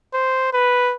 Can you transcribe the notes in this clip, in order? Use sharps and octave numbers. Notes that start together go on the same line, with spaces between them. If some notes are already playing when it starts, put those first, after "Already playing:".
C5
B4